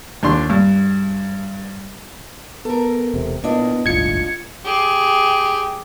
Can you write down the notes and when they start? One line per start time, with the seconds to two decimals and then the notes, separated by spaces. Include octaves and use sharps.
0.23 D#2 D4 C6
0.50 G2
2.65 B3 A4 A#4
3.14 E1 C3
3.44 A#2 B3 D4 E4 D#5
3.86 D#1 G#1 D2 F4 G#6 C#7
4.64 G4 G#4